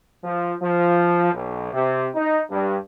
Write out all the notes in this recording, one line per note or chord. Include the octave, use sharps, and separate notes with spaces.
F3
F3
B1
C3
D#4
G2